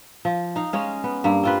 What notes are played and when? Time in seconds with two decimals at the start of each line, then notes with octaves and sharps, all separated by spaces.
0.25 F3
0.56 D#4 F5
0.73 G#3 C#4 F5
1.04 B3
1.24 G2 A#3
1.43 C4 F4 B4